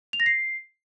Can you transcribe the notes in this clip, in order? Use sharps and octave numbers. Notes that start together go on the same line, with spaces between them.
F7
A#6
C7